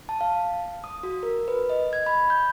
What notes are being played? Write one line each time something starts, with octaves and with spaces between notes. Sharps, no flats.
A5
F5
D#6
F#4
A#4
B4
D#5
G#6
B5
G6